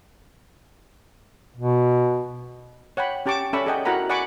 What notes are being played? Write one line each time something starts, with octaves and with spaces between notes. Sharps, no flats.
B2
C#5 F#5 G5 B5
C#4 G4 A5 C#6 D6
C#4 A4 D5 E5 B5 C#6
G#4 A4 D5 D#5 F#5 G5
E4 F#4 A#4 F#5 A#5 B5
D5 F#5 G#5 B5 C#6 D6